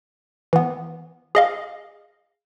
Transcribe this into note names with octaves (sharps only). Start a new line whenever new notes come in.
E3 B3
G#4 D#5 F5